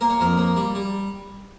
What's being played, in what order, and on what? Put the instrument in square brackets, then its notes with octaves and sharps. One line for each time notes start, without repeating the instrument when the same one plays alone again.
[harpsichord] A#3 A#4
C#5
F2 A#4
A#3
G3
G3